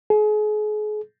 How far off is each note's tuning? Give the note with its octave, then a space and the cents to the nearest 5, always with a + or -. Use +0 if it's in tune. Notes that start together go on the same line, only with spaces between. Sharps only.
G#4 +35